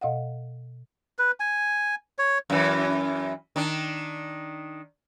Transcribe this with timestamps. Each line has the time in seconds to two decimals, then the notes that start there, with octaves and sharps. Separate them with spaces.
0.01 B2 D#5 F5 F#5
1.19 B4
1.40 G#5
2.18 C#5
2.50 F#2 E3
3.56 D#3 D4